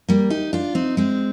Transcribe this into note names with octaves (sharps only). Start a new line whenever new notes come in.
G3 A#3
D#4 G4
D4 F4
C4 D#4
G#3 C4